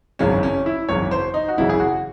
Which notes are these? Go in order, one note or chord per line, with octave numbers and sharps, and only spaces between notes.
G#1 F#2 C#3 E3 C#4
C#4
E4
G#1 F#2 C#3 E3 C#5
C5
D#4
F#4
G#1 F#2 C#3 E3 E4
G#4
F#4